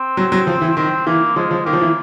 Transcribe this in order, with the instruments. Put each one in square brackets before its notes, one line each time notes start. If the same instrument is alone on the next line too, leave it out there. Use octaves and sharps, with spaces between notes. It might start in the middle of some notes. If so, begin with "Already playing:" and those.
Already playing: [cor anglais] C4
[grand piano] F#3
F#3
F3
E3
[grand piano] D#3 [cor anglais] C4
[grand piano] E3 [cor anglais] A#3
[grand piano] F3 [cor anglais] G#3
[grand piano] F3
[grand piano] D#3 [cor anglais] A#3
[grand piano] F3
E3